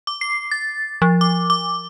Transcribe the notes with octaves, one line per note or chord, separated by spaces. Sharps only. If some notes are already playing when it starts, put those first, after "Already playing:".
D6
C7
A6
F3
D6
D6